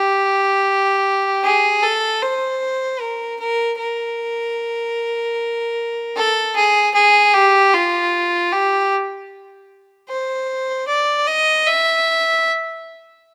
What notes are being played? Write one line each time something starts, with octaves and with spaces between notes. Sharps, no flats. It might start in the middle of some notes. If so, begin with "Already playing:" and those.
Already playing: G4
G#4
A4
C5
A#4
A#4
A#4
A4
G#4
G#4
G4
F4
G4
C5
D5
D#5
E5